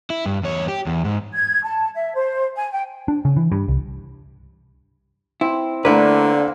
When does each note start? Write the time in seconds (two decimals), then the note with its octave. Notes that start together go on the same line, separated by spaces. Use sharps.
0.10 E4
0.26 G2
0.43 E2 C#5
0.68 G4
0.86 E2
1.05 G#2
1.33 G#6
1.63 A5
1.95 E5
2.13 C5
2.56 G#5
2.72 G5
3.08 D4
3.25 C#3
3.37 E3
3.52 G2
3.68 C2
5.41 C4 E4
5.85 D3 A3 A#3 D4 E4 B4 C5